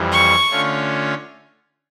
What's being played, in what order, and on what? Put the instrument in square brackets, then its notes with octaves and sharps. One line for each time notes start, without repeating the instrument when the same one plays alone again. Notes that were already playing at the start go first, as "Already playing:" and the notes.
Already playing: [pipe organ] F2 E3 G3
[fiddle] C#6
[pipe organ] D3 A3 C#4 F4 C#5